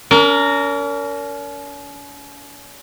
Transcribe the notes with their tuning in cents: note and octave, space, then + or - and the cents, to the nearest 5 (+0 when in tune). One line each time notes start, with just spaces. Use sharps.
C#4 +45 A#4 -10